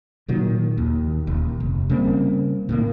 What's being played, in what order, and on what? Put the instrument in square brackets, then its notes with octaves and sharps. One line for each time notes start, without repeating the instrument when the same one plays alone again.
[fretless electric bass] A#2 D#3 F#3
D#2
D#1 D#2
F1
C#3 G3 A#3 C4
A2 D#3 A#3